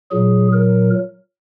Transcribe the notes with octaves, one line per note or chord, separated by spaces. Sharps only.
A#2 F#3 G#4
A#4